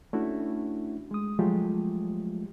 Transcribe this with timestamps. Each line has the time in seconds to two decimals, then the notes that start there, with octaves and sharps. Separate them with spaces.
0.13 A3 C#4 D4 E4 F#4
1.11 G#3 D#6
1.39 F3 F#3 G#3 A3 F4 G4